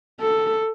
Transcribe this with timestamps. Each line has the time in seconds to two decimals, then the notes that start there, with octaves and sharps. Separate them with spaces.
0.21 A4